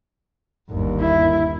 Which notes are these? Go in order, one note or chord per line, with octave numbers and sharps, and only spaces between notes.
G1 D#2
E4